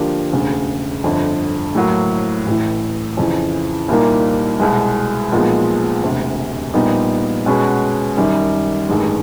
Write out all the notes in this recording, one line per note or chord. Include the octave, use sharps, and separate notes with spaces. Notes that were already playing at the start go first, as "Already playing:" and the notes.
Already playing: D3 F3 A#3 D4 G4
E1 D2 C#3
G1 F2 D3
A2 F#3 A#3
A1 A2 E3
F2 C#3 E3
C2 A#2 G3 A#3 D#4
C2 B2 G#3
B1 A#2 F3 G#3 B3
E1 D2 C3
A#1 A#2 G3 B3 D#4
B2 G#3 C#4 F#4 B4
F#2 D#3 G3
A1 G2 D#3 G#3